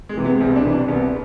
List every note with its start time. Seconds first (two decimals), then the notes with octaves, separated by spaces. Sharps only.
0.09 G#3
0.17 C3 E3
0.25 B3
0.40 C2 C4
0.56 D4
0.64 C3 E3
0.72 D4
0.88 C2 B3